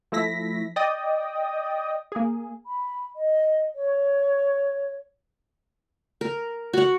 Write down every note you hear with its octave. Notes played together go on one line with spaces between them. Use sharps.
F3 A3 E4 A#6 B6
D5 D#5 G5 D#6
A#3 G#4
B5
D#5
C#5
A#4
F#4 F#5